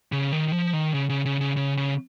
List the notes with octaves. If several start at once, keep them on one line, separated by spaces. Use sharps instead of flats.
C#3
D#3
D#3
F3
D#3
C#3
C#3
C#3
C#3
C#3
C#3